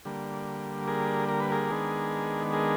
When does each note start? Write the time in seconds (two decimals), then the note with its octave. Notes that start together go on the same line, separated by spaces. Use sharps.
0.05 D3 G3 A#3
0.88 G#4 A#4
1.29 A#4
1.40 B4
1.52 G#4 A#4
1.70 D#3 G#3 B3 D4
2.53 G#4 A#4